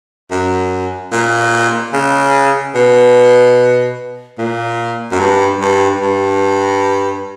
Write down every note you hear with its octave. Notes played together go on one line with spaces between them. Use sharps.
F#2
A#2
C#3
B2
A#2
F#2
G2
G2
G2